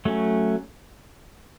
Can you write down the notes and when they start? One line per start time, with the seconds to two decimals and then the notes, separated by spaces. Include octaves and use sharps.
0.05 F#3 A3 C#4